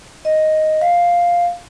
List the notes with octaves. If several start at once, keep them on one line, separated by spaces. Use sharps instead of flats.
D#5
F5